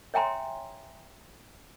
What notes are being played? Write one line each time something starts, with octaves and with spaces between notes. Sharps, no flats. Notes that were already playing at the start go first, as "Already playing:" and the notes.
C#5 E5 G5 G#5 A#5 C6